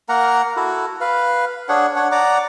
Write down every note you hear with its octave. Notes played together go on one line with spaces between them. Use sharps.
A#3 A#4 F#5 A#5
E4 F#4 A4
B4 F5
D4 G#4 C#5 F#5
D4 C#5 F#5
D5 F#5 A#5 D6